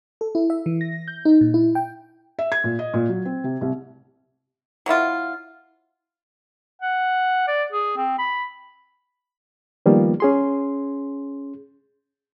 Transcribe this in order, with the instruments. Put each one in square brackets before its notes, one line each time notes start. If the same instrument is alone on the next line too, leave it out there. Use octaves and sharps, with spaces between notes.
[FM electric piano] A4
E4
E5
E3
A#6
G6
D#4
A#2
E4
G5
[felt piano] E5
G#6
A#2
D#5
A#2
F#3
C4
C3
C2
[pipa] F#3 A#3 E4 F4
[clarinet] F#5
D5
G#4
C4
B5
[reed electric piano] D#3 F3 G3 A#3 B3 F4
C#4 G#4 C6